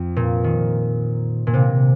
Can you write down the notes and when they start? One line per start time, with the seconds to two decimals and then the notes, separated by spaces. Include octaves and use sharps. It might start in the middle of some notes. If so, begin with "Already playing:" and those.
Already playing: F2
0.16 A#2
0.44 D#3
1.47 A#2
1.54 C3